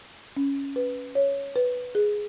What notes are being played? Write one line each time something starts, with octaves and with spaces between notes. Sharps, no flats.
C#4
B4
C#5
B4
G#4